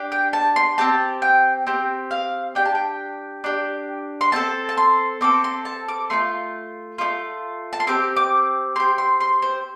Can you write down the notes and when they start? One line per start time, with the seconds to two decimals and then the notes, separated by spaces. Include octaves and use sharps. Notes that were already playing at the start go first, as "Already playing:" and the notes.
Already playing: D4 G4
0.12 G5
0.33 A5
0.56 C6
0.78 C4 G4 A5
1.22 G5
1.67 C4 G4
2.11 F5
2.55 D4 G4 G5
2.65 A5
2.75 G5
3.44 D4 G4
4.21 C6
4.32 C4 A4 A5
4.69 A5
4.77 C6
5.21 C4 A4 D6
5.44 C6
5.65 A5
5.89 D6
6.10 A3 D4 F4 C6
6.98 A3 D4 F4
7.73 A5
7.80 C6
7.87 C4 G4 D6
8.16 D6
8.76 C4 G4 C6
8.98 C6
9.20 C6
9.42 C5